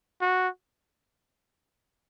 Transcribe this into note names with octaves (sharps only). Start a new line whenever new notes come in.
F#4